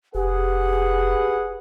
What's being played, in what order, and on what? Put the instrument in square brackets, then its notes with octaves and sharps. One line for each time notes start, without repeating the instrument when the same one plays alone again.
[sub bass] F1 [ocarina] G4 [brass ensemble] G#4 B4 F#5